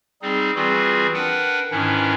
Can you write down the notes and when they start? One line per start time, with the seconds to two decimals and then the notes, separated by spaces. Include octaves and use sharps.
0.22 G3 C4 D#4 G#4
0.55 E3 G3 C4 F4 F#4 G#4
1.14 D4 A#4 B4 F#5 G5
1.71 G#2 D#3 E3 C#4 D4 E4